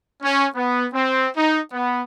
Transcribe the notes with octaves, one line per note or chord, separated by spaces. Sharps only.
C#4
B3
C4
D#4
B3